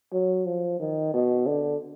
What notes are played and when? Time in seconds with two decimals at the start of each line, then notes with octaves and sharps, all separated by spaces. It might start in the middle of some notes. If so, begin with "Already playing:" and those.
0.13 F#3
0.46 F3
0.80 D#3
1.14 B2
1.46 D3